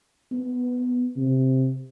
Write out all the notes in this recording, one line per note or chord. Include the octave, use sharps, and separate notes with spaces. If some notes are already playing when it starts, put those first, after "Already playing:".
B3
C3